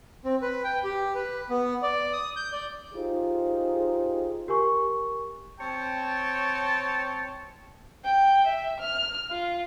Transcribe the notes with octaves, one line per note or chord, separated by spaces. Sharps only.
C4
B4
G5
G4
B4
B3
D5
D#6
G6
D5
D#4 F4 G4 G#4 C5
G4 A#4 G#5 C#6
C4 C#5 G5 A5
G5
E5
F6
F4